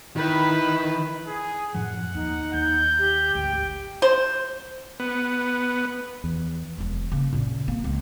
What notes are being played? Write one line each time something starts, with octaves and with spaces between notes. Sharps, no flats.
D#3 E4 B4
G#4
F#2 A2 F3 F#5
D#2 D#4
D#2 G6
G4
G#1 D2 G5
C5
B3
E2
E1 F#3
C#3 A#3
A#2 C#3
A#3
C#2